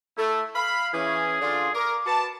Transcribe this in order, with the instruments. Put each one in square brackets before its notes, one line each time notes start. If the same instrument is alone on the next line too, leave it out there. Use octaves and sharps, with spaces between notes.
[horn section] A3 [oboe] E4
[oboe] F5 [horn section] B5
[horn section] E3 C#4 [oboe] G#4
[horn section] D3 D4 F4
[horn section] A#4 [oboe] D6
[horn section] F#4 B4 A5